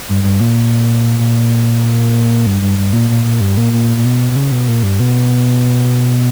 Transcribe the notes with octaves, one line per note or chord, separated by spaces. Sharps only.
G2
G2
A#2
A#2
G2
G2
G2
A#2
A#2
A#2
G2
A#2
A#2
A#2
B2
B2
C#3
B2
A#2
G2
B2